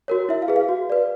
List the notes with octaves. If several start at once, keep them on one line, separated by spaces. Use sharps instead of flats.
F#4 A#4 C#5
E4 E5
F5
G#4 B4
F5
F#4
B4 D5